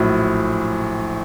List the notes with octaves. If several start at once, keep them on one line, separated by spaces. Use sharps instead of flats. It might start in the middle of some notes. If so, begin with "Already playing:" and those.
Already playing: A#1 A2 F#3